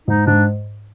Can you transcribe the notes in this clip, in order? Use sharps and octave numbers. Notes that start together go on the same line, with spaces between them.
G#2 D#4
G#2 D4